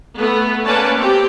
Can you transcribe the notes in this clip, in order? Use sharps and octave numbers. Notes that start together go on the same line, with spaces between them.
A3 B3
A#3 C#4 B4 C#5 D5 A5
C4 G4